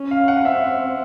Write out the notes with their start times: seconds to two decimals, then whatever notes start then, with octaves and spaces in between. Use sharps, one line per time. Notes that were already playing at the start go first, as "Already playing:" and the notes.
Already playing: C#4
0.11 F5
0.28 F#5
0.45 C4 E5